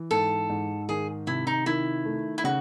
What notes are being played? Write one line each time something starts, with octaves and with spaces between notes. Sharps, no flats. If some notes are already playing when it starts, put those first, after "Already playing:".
Already playing: E3
G#2 A4
G#2
D#3 G#4
C3 E4
D#4
D#3 E4
A3
E4
C#3 F#4